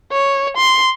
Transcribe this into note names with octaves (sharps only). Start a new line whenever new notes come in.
C#5
C6